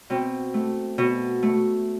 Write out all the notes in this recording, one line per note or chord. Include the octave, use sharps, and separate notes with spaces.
B2 C4
A3
B2
A3